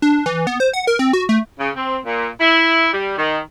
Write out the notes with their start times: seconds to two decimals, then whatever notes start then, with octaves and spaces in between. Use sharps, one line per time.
0.02 D4
0.26 E3
0.47 B3
0.60 C5
0.73 F#5
0.87 A#4
0.99 C4
1.13 F#4
1.29 A3
1.58 C#3
1.76 C4
2.06 A#2
2.41 E4
2.92 G3
3.18 D#3